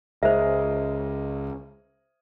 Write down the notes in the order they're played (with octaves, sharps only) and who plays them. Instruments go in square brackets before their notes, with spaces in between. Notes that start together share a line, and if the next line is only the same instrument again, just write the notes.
[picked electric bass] C#2 [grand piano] G#4 A#4 D#5 [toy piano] C5 E5